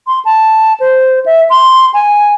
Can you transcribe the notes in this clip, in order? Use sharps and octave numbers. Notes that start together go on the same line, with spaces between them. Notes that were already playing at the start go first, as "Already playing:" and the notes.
C6
A5
C5
E5
C6
G#5